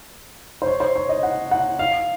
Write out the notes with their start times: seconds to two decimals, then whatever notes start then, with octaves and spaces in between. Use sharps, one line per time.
0.62 C5
0.67 C#5
0.80 C5
0.96 C#5
1.09 D#5
1.23 F#5
1.51 F#5
1.79 F5